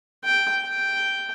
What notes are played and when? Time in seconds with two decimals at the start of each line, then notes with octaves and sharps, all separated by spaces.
0.24 G5
0.66 G5